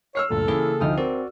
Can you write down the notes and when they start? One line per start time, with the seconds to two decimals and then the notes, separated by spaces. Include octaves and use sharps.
0.15 C#5 E6 F6 C7
0.30 D2 G2 A#2 A4
0.47 C#3 E3 A#3 C#4 E4 G#4
0.81 D2 F3 D#4 G5 D#6 F6
0.98 C4 F#4 A#4 D5